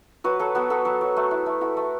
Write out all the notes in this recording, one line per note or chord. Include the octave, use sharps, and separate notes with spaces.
F#3 F#4 B4
F#3 A4
B3 F#4
B3 A4
F#3
F#3
A3
E4
A3
E4 F#4
A3